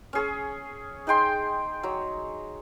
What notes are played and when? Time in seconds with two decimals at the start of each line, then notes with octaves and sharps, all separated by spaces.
0.13 C#4 G#4 C#5
1.07 D#4 G#4 G5 C6
1.83 F#3